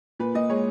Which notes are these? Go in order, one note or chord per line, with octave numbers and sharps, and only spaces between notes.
A#2 B4
A#2 D#5
G#3 C#5